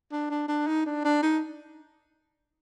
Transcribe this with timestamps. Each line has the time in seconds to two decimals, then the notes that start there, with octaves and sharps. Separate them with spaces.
0.12 D4
0.30 D4
0.48 D4
0.67 D#4
0.86 D4
1.05 D4
1.23 D#4